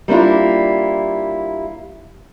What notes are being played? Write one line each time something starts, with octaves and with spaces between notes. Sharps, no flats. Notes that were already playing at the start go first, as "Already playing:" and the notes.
G3 A#3 D4 E4 F4